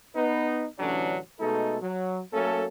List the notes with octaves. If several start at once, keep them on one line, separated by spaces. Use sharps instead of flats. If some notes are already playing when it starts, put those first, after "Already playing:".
B3 D#4 B4
A1 D3 E3 F#3 C#4 D4
B2 G#3 A3 D#4 A4
F#3
F#3 A3 A#3 C#4 A4